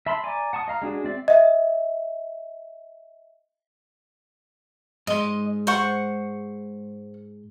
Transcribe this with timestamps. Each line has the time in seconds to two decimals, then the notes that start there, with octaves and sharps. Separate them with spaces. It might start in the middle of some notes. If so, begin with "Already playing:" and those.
0.06 E5 A5 B5 C6 E6
0.24 D5 G#5 A#5 D6
0.53 F#5 A5 C#6 D#6
0.68 D#5 F5 A#5
0.82 G#3 D4 F#4 G#4
1.04 C4 D5 E5
1.28 D#5 E5
5.07 G#2 G#3 D#5 C6
5.67 C5 F#5 C#6